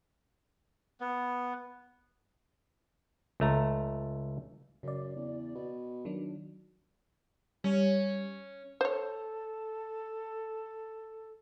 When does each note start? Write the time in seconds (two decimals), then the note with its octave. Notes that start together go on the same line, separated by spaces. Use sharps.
1.00 B3
3.40 C#2 A3 A#5
4.83 F#2 C#3 D5
5.16 E2
5.55 B2
6.05 D#3 F#3 D4
7.64 G3 C#4
8.81 A4 C5 C#5